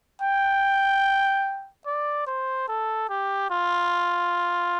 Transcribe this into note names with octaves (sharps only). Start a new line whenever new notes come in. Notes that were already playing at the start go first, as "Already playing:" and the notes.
G5
D5
C5
A4
G4
F4